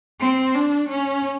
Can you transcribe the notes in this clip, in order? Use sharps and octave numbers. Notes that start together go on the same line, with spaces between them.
C4
D4
C#4